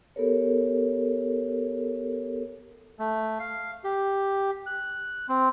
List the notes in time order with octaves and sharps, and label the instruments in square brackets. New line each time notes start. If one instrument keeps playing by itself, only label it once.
[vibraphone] B3 G4 A4 A#4 C#5
[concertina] A3
F5
G4
F#6
C4